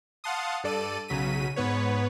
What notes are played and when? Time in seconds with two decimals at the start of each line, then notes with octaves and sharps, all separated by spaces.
0.24 F5 F#5 A5 C6 D#6
0.64 G2 A4 D5 D#7
1.08 B1 C#3 F#3 B6 D#7
1.56 G#2 B3 B4 C#5